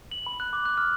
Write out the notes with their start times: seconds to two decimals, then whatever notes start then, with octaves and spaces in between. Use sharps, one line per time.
0.11 F#7
0.26 B5
0.40 F#6
0.53 D6
0.65 F#6
0.77 F6